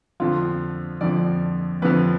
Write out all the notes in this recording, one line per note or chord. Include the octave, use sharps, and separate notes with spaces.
F2 D3 F3 F4
F2 D3 F3 D5
F2 D3 F3 B4